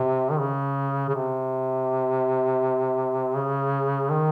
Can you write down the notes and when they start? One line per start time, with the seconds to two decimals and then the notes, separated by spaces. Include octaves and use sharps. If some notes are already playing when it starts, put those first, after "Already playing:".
Already playing: C3
0.31 D#3
0.40 C#3
1.09 C#3
1.15 C3
3.36 C#3
4.10 D#3